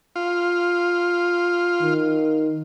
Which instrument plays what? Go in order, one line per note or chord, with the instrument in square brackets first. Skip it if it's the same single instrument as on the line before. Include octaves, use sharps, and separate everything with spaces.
[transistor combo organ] F4
[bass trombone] D#3